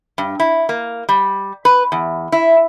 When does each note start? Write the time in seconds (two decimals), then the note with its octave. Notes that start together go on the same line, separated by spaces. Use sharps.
0.18 G2
0.40 E4
0.69 A#3
1.09 G3
1.65 B4
1.92 E2
2.32 E4